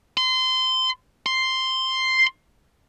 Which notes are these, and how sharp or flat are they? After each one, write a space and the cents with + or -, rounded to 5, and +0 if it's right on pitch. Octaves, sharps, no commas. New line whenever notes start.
C6 -25
C6 +0